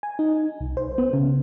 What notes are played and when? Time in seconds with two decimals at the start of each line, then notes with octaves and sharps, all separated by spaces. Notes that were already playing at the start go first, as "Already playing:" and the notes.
0.03 G#5
0.19 D#4
0.60 C2
0.77 C5
0.98 B3
1.13 C#3